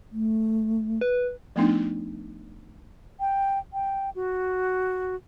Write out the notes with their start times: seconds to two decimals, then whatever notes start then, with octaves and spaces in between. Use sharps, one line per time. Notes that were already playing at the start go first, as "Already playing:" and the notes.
0.12 A3
1.01 B4
1.56 F3 A3 B3 D4 D#4
3.20 G5
3.73 G5
4.15 F#4